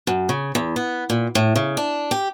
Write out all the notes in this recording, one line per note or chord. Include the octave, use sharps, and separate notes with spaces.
F#2
C#3
E2
B3
A#2
A2
C#3
D4
G4